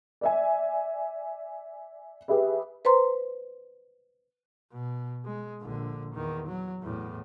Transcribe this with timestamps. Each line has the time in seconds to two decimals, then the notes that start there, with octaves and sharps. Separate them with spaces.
0.21 D5 E5 G#5
2.28 G4 G#4 B4 E5
2.85 B4 C5 A#5 C6
4.72 B2
5.25 G#3
5.61 A#1 D3
6.14 E2 D#3
6.48 F#3
6.83 E2 A2